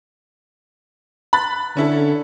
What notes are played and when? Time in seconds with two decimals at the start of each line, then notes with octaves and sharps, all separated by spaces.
1.33 B5 F#6 A6
1.77 D3 C#4 E4 A4